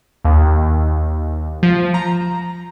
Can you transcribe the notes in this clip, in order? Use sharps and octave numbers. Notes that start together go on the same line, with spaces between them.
D#2
F3
A#5